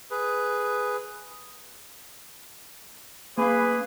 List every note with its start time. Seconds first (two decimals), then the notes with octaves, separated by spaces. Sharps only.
0.11 G#4 B4
3.38 A#3 C#4 G#4 B4 F5